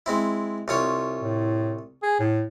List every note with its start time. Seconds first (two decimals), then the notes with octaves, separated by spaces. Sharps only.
0.06 G#3 C4 E4
0.68 C2 F4 C#5
1.21 A2
2.03 G#4
2.20 A2